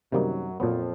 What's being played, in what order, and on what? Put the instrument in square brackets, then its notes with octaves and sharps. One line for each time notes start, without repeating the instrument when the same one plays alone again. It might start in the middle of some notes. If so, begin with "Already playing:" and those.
[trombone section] F#2 F#3 [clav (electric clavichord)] C3 D#3 G3 A#3 D#4
[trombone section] F2 F3 [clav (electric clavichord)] A#2 F#3 B3